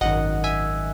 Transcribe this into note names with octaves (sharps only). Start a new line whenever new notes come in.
G#1 F#2 D#3 D#5 F#5
E5 G#5